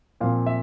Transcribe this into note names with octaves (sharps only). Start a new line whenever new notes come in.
A#2 F3 C4 F5
E5